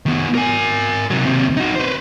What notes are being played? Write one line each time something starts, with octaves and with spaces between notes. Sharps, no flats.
D#3 B3
A#4 G#5
C3 F#3
D#2 C3
D#4 F#4
B4 C5